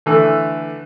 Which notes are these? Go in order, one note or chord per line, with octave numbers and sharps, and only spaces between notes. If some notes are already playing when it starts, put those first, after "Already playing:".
D3 E3 A3